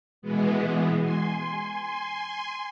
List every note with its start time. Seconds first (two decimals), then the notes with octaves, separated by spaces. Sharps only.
0.22 B2 E3 G#3 B3
1.02 G#5 C6